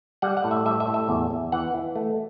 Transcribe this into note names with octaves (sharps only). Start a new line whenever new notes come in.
G3 F#5
F#5
A2
E5
G3 E5
E5
A2
E5
E2
E2
E3 F#5
E3
A3